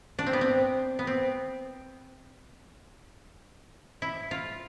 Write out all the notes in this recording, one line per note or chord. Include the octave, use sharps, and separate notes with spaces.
D4
C4
B3
C4
B3
C4
E4
F4